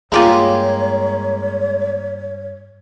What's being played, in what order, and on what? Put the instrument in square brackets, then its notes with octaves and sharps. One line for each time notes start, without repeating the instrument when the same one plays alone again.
[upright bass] G2 [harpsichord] G#3 A#3 [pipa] F4 G4 C6 [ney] C#5